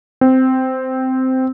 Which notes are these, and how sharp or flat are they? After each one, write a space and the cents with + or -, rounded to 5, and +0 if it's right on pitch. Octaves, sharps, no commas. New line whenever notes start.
C4 -10